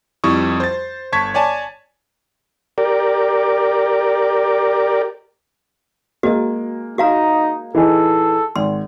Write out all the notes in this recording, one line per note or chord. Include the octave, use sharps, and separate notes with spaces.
F2 G3 E4 C#6 D#6
C5 A6
G1 A5 C#6 G#6 B6
C#5 D5 G#5 A5
G4 A#4 D5
G#3 A#3 F#4 D#5
D#4 F#4 F5 A#5
E3 D#4 G#4 A4
G#1 C6